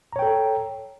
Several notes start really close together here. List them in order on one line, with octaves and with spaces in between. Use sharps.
A#5 C#5 G5 A4